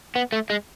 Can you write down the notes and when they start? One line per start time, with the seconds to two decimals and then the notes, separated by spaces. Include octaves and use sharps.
0.16 B3
0.32 A3
0.50 G#3